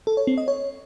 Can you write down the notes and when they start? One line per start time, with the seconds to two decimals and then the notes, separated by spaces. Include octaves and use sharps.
0.07 A4
0.17 C#5
0.27 C4
0.38 D#5
0.48 C#5